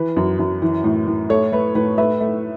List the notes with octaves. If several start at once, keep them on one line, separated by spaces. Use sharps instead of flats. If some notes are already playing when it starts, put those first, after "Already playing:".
Already playing: E3 B4
F#2
F#2
E3
A2
A2
A3 A4 C#5
A3 B4
A2 B4
A3 B4 E5
A3